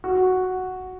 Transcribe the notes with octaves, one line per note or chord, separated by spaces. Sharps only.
F#4